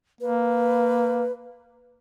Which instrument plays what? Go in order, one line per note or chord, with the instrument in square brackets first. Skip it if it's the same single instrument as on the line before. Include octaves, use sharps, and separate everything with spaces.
[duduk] A#3 [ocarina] B4